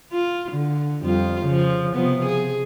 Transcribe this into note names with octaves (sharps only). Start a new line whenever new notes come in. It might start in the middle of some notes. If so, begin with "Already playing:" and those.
F4
D3
F2 G3 F4
C#3 F3
C3 F3 B3
G#4